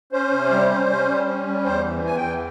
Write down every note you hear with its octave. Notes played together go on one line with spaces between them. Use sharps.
C#4 C5
C3
G3
C#4
C#4
G3
C#4
G3
E2 C5
E3
E2 G#5
G5
E3